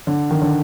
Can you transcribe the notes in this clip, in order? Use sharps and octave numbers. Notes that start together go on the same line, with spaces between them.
D3
D#3
D3